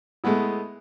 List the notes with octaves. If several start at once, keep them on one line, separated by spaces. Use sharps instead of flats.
G#3 A3 B3 E4